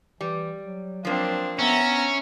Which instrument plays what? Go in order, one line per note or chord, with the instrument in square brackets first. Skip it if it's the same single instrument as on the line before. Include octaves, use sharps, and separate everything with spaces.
[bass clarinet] E3 [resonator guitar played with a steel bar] G3
[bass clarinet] F#3
[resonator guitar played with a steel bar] F3 A#3 [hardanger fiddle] C4 D4
[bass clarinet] B3 [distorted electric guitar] C#4 [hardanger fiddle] E5 A#5